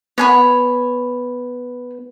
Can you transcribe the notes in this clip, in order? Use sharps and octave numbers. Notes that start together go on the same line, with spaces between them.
B3 C#5 G#5 B5